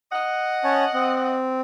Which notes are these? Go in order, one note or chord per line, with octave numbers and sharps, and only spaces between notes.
D#5 F#5
C#4 C#5 A5
C4